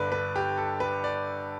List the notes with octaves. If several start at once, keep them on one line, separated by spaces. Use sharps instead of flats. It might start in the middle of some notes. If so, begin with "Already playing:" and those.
Already playing: G1 G2 D3 B4 D5
B4
G4
A4
B4
D5